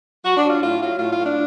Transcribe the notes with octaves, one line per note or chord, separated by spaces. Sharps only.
F#3 F#4
D4
F#3
F4
A2 F4
F#3 F4
A2 F4
F4
A2
D4